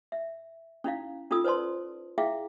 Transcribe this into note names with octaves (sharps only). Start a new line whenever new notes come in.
E5
C#4 D#4 E4 F5
C#4 D#4 F4 A4 D#6 E6
B4 C5 D5 A5 C6
E4 G#4 E5 F5 G5